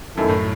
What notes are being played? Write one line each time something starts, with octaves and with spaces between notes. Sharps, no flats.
F#2 D#3 A3 E4 A4
A2